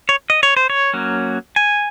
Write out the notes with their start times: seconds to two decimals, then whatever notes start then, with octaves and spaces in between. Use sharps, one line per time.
0.09 C#5
0.30 D#5
0.43 C#5
0.57 C5
0.70 C#5
0.94 F#3 A#3 C#4
1.56 G#5